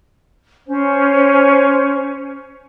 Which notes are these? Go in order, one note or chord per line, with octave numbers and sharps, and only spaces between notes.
C#4 C5